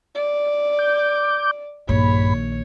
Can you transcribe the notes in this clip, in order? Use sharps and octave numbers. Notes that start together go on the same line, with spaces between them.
D5
D6 G6
A#1 G2 D#3 C#5 B5